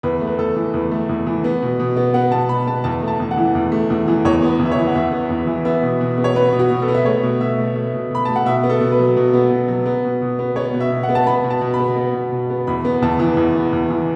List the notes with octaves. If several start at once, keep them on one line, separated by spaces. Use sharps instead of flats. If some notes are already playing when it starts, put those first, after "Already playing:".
E2 B4
A3
B4
E2 A4
E3
E2 B4
A3
E2
E3
B3
B2
B2
B3
B3 F#5
B2 A5
B2 B5
B3 A5
E2 A5
A3
A5
E2
F#5
E3
E2
A3
E2
E3
E2 C#5
B3
B4
E2
E5
C#5
E3
F#5
E2 E5
B3
E2
E3
B3 E5
B2
B2
B3
C#5
B3 B4
B2
F#4
B2
A4
B3
E5
A3 C#5
B2
B2 E5
A3
A3
B2
B2 B5
A3 A5
F#5
B2 E5
B3
A4
B2
B4
F#3
B2
B3
B2
F#3
B3
B2
B2
B3
B3 C#5
B2
E5
B2
F#5
B3
A5
B3 B5
B2
A5
B2
B5
B3
B3
B2
B2
B3
E2 B5
B3
E2 A5
E3
E2
B3
E2
E3